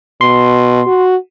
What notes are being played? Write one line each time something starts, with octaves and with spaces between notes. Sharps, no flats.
B2 C6
F#4